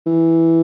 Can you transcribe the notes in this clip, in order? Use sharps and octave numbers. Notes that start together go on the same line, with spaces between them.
E3